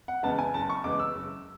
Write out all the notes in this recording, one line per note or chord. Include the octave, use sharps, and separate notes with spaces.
F#5
E2 C#3 G#3 B3 A5
G#5
F#1 A5
C#6
E2 C#3 G#3 B3 D6
E6
F#1